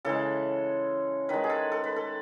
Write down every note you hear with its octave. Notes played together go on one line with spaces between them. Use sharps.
C#3 E3 G#3 A4
D#3 G#3 B4
G#4
A4
A4
B4
A4